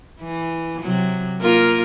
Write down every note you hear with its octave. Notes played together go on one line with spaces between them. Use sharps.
E3
C3 F#3
A#3 F4 A#4